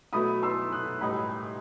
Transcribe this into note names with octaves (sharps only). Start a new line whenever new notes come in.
B2 F#3 A3 E4 B5 D#6
C6 E6
D#6 F#6
A2 G3 D#4 B5 D#6